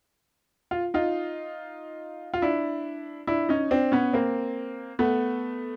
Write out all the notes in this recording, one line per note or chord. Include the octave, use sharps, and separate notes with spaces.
F4
D#4 F4
F4
D4 E4
D4 E4
C#4 D#4
C4 D4
B3 C#4
A#3 C4
A3 B3